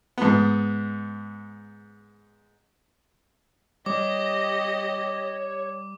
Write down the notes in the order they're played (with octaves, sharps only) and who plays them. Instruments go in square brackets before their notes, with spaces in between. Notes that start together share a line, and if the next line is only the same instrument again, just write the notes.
[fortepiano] G#2 B3
[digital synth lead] G3 [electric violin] G4 D#5 [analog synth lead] C#5 [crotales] D6